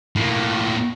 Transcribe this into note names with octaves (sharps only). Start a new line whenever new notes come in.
A2 A#3